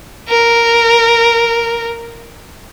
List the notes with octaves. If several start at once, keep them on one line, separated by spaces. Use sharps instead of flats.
A#4